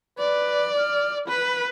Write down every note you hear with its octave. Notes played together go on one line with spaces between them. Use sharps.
B4 D5
F6
B4 B5